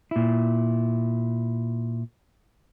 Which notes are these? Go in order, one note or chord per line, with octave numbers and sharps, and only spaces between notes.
A#2 E4